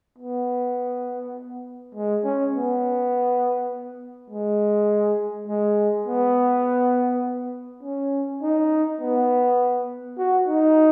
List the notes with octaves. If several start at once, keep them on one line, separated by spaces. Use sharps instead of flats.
B3
G#3
C#4
B3
G#3
G#3
B3
C#4
D#4
B3
F#4
D#4